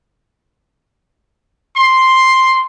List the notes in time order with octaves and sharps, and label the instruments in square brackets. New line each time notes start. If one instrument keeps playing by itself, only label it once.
[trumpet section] C6